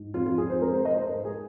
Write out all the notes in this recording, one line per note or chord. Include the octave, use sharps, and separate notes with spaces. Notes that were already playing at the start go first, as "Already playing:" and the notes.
Already playing: G#2
F2 F4
F4
F2 G#4
C5
G#3 A#4
C5
G#3 D#5
C5
G#2 A#4
G#4